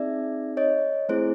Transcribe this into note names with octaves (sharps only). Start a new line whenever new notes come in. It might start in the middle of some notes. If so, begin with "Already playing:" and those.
Already playing: C4 D#4 G#4 D5 E5
C#5 D#5
A3 C4 E4 G#4 C5